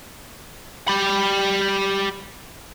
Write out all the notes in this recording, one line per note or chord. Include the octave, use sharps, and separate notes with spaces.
G4 B5